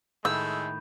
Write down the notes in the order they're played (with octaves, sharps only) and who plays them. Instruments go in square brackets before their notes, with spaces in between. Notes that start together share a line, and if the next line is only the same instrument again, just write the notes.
[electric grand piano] A2 D#3 [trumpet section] G#3 A3 [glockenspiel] B5 G6 [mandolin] E6